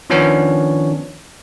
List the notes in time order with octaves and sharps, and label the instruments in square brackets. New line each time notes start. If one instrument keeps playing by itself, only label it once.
[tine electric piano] D#3 F3 B3 C#4 D4 C#5